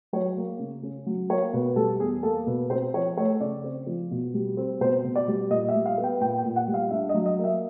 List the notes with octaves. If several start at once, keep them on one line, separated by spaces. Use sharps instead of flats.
F#3 C#5
A#3
C#3
C#4
F#3
A#3 C#5
B2 B4
G3 A4
E2 G#4
A#3 A4
B2 B4
C4 C5
F3 C#5
A3 C#5
C#3 D5
C4
F3
B2
G3
C4
B2 C5
B2
D5
G3
A#2 D#5
E5
G3
F5
B3
G5
A#2 G5
G5
A#2
F#5
G3
F5
D4 E5
D#5
F#3
D#5
A#3
E5